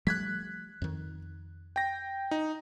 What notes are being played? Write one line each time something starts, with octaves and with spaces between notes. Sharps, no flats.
F3 G3 A3 F#6 G#6 B6
F2 D#3
G5 A#6
D#4